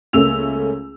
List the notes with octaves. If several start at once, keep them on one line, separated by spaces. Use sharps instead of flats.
C#2 A3 A#3 C#4 E6 F7